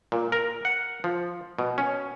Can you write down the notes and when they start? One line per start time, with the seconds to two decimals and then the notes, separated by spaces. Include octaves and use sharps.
0.12 A#2
0.32 A#4
0.65 F#5
1.04 F3
1.59 B2
1.78 C#4